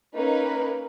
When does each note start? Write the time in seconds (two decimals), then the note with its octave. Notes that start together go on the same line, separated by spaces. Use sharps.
0.16 A#3 C#4 D#4 A#4 B4